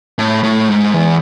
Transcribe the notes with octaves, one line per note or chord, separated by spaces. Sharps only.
A2
A2
G#2
E2